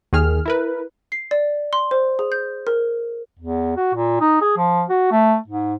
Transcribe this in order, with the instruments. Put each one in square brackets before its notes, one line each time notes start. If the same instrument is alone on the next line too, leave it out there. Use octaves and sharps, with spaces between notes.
[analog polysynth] D#2 D#3 G#4 F6
E4 A#4 B4
[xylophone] C7
D5
C6
C5
G#4
G6
A#4
[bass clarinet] E2
F#4
A#2
D#4
G#4
F3
F#4
A3
G#2